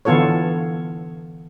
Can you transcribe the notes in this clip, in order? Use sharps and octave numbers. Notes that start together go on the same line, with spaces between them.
D3 E3 B3 F4 A4 C#5